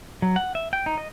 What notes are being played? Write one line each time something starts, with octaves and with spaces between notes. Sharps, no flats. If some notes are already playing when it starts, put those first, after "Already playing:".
F#3
F#5
E5
G5
D#4
D#5